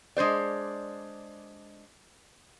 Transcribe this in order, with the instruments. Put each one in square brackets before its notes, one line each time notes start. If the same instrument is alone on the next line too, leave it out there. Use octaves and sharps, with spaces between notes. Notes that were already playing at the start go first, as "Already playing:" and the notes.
[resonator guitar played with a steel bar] G#3 D4 C5 D5